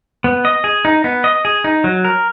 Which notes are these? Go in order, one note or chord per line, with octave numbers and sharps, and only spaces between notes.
B3
D#5
G#4
D#4
B3
D#5
G#4
D#4
F#3
A#4